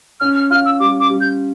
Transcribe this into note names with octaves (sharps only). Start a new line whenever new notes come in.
C#4 F6
F6
F4 F6
E6
G3 D6
D6
G3
G6